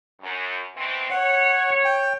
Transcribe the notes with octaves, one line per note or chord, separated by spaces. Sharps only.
F#2
B2 E3 C4
C#5 F#5
G5